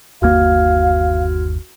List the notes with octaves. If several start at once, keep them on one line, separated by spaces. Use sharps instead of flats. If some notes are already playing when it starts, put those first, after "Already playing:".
G1 D#2 A#3 F#4 F5 F6 G#6